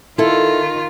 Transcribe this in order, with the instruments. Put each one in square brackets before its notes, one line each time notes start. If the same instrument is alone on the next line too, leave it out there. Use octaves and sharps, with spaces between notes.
[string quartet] D#3 F4 [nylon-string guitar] E4 A4